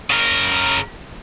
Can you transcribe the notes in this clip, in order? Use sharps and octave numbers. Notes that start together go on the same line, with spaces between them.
C#3 A#4